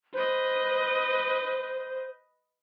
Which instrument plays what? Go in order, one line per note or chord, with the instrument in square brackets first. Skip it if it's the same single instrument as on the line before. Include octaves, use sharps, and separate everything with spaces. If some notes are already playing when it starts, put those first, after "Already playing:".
[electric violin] B4 D#5 [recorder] C5